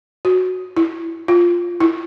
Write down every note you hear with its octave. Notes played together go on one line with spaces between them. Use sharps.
F#4
E4
F4
E4